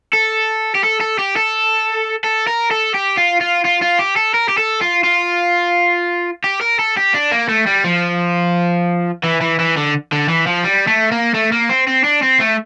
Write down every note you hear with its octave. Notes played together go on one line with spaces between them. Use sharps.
A4
G4
A4
A4
G4
A4
A4
A#4
A4
G4
F4
F4
F4
F4
G4
A4
A#4
G4
A4
F4
F4
G4
A#4
A4
G4
D4
A#3
A3
G3
F3
E3
E3
E3
D3
D3
E3
F3
G3
A3
A#3
A3
A#3
C4
C4
D4
C4
A3